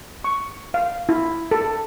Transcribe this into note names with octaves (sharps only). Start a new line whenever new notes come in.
C#6
F5
E4
A4